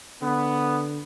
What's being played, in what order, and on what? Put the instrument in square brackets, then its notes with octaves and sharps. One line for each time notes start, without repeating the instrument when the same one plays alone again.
[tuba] D3 [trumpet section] B3